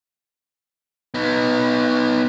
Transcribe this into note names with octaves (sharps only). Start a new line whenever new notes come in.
B3 D#4